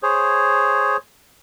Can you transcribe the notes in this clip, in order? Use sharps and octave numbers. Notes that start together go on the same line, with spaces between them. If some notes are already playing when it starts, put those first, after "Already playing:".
G#4 C5 C#5